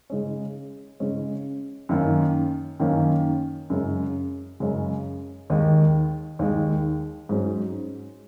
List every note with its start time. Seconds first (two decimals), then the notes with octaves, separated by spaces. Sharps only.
0.10 C#3 G#3 C#4
1.00 C#3 G#3 C#4
1.89 F#2 D#3 A#3 C#4
2.80 F#2 D#3 A#3 C#4
3.70 F#2 C#3 G#3 C#4
4.60 F#2 C#3 G#3 C#4
5.50 D#2 D#3 G#3
6.39 D#2 D#3 G#3
7.29 G#2 F#3 C#4